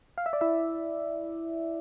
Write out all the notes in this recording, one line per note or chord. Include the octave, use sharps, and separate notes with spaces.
F5
E5
D5
E4 E5